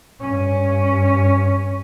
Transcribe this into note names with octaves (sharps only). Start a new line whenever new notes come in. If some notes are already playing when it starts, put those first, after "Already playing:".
G2 C#4